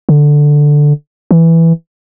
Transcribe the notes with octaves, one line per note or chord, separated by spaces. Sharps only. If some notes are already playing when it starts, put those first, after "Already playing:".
D3
E3